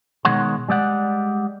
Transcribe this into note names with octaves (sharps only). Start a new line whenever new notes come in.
B2 D#3 G#3 C#5 F#5 C6
G3 G#3 D5 F#5